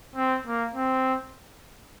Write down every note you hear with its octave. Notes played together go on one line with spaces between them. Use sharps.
C4
A#3
C4